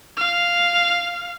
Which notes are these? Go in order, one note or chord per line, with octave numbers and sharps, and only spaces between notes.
F5